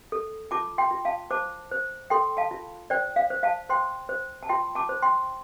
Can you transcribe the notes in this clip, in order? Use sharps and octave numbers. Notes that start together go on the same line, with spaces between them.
A4
F4 A5 D6
G5 C6
F4
F5 A5
C5 A5 D6
C5
A4 G5 C6
F5 A5
F4
C5 D5 G5
F5
C5
F5 A5
C5 G5 C6
C5
A5
F4 G5 C6
A5 D6
C5
G5 C6